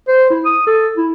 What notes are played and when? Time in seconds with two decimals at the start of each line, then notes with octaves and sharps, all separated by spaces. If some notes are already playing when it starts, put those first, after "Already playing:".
0.08 C5
0.30 E4
0.45 D#6
0.67 A4
0.97 E4